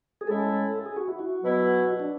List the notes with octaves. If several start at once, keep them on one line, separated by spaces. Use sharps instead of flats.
G#4
A2 G#3 C#4 E4 A4
G#4
F#4
E4
F#4
B2 F#3 B3 E4
D4